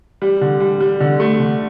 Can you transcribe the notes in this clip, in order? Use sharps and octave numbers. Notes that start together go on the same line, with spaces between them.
G3
D3
G3
G3
D3
A3
D3